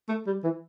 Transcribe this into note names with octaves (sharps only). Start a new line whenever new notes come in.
A3
G3
E3